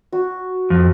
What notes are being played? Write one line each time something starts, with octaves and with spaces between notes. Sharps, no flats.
F#4
F2